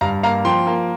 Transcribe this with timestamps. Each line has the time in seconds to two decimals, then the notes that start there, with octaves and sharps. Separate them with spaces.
0.01 G2 F5 A#5
0.23 A#3 F5 A#5
0.45 F3 G5 C6
0.67 A#3